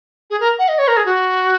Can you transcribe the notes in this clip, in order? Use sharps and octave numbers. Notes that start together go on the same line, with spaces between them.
G#4
A#4
F#5
D#5
C#5
A#4
G#4
F#4